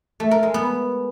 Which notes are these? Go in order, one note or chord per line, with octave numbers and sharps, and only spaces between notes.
A3
A#4
G#3
B3